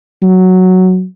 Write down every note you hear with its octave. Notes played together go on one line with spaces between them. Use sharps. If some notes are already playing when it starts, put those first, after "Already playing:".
F#3